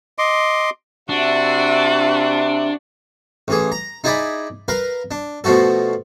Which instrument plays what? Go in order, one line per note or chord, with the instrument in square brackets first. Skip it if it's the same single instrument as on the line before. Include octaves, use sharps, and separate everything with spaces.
[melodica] D#5 C6 D6
[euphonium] C3 [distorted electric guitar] D4 [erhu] F#4 [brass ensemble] E5
[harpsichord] A1 E3 G#4
A#5
D#4 E4 G#4 D5 G#5 B5
A#4 B4 F5
D4
B2 F3 A3 F#4 A4